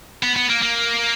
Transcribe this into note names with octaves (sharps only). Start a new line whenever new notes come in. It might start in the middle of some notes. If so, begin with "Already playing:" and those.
B3
B3
A#3
A#3